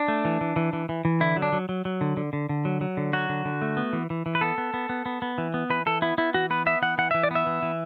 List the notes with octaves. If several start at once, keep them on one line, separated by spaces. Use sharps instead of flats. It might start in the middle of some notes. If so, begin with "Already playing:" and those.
Already playing: D4
A3
E3
E3
E3
E3
E3
E3
D3 E4
F#3
D4
F#3
F#3
F#3
D3
D3
D3
D3
F#3
F#3
D3
F#3 F#4
D3
D3
A3
B3
E3
E3
E3
B4
B3 A4
B3
B3
B3
B3
B3
E3
B3
E3 B4
E3 A4
B3 E4
B3 E4
E3 F#4
B3 B4
B3 E5
E3 F#5
E3 F#5
E3 E5
D5
B3 E5
E3
E3